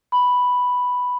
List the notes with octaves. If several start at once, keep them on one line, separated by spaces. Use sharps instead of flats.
B5